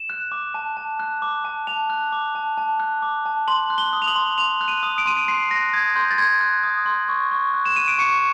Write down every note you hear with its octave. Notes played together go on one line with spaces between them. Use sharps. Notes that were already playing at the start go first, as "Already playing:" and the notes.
Already playing: E7
F#6
D6
A5
A5
F#6
D6
A5
A5 F7
F#6
D6
A5
A5
F#6
D6
A5
C6 F#7
F#6
G7
D#6
F7
F#7
C6
C6 F7
F#6
D#7
D#6
D7
C6 D#7
D7
C6 C7
F#6 A#6
D#6 G#6
C6 G6
A6
C6 G#6
F#6
D#6
C6
C#6
C#6
F#6
E7
F#6 D#7
D7
C#6 C#7